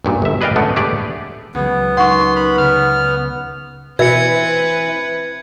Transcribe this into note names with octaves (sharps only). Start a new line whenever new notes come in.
B1 G2 A#2
G1 E5
G#4 B4 D5 D#5 F5 G5
D3 A3 B3 C#4 D4
A3 D4 G4 G#4 B4 D5
C#2 F#3 B3
G#3 D#4 A#4 F#5 C6 C#6
B5 F6
C#3 B4 F6
B2 E3 C4 B4 E5 G#6 C#7